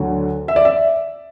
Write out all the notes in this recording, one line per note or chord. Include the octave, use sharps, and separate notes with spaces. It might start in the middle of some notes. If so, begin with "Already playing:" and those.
Already playing: D2 D3 F#3
E5
D5
E5